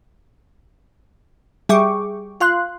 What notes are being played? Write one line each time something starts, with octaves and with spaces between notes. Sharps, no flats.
G3 G#4 E5 G5 C#6 D6
F4 F5 C6 F#6